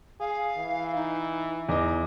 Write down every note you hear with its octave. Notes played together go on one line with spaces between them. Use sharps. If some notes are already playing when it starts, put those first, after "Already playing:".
G#4 F5
E3
D#4
E2 D#4 D#5 D6